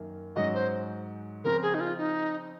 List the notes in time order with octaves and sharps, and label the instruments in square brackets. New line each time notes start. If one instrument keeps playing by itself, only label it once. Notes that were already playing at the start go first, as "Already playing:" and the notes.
Already playing: [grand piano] F#2 D#3 A#3
[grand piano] G#2 F#3 C#4 F#4 [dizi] D#5
[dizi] C5
[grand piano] C#3 F3 C4 [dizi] A#4
[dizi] G#4
D#4
F4
D#4